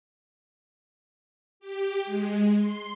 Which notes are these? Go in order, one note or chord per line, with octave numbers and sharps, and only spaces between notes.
G4
G#3
C6